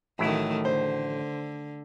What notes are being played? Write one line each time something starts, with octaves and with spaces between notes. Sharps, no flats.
A1 D#3 F#3 A3 E4
D3 C5